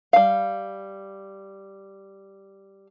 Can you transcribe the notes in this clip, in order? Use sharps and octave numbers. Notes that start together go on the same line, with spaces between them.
G3 F5